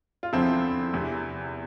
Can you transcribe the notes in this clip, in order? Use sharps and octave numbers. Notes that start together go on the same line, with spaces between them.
F4
E2 D3 F3 C4 E4
E2 C3 E3